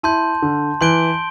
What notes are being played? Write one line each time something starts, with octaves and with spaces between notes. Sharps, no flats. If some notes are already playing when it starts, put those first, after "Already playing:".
E4 A5 C6 G6
D3
E3 C6 G6 D7 G7